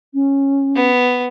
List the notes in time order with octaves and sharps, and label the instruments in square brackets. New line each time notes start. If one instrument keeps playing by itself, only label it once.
[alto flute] C#4
[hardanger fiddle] B3